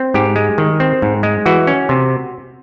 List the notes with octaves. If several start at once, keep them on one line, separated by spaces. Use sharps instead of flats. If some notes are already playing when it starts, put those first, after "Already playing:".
Already playing: C4
G#2 G4
G#3
D#3
C4
G#2
G#3
E3 F#4
C#4
C3